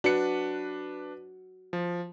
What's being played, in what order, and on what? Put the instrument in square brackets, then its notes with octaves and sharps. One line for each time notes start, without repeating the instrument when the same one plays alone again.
[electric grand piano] D4 B4 C#7 [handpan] F#4
[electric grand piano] F3